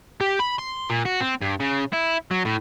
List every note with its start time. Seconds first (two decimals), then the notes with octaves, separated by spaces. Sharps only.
0.21 G4
0.39 B5
0.58 C6
0.90 A#2
1.05 F#4
1.20 C4
1.41 G2
1.60 C#3
1.93 E4
2.31 F#3
2.45 A2